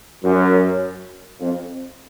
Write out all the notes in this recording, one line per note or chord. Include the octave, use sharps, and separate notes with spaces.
F#2
F2